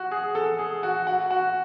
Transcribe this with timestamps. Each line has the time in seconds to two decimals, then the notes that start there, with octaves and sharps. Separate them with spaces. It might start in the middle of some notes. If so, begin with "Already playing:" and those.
Already playing: F#4
0.11 G#4
0.35 A4
0.59 G#4
0.83 F#4
1.07 F#4
1.30 F#4